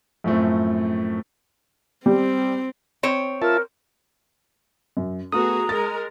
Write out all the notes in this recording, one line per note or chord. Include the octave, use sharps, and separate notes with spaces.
F#2 A2 F3 A3 C4
G3 C4
C4 C#5
F4 A#4 E5 A5
F#2
A3 B3 F#4 G#4 A#5 D#6
G#3 A#4 A6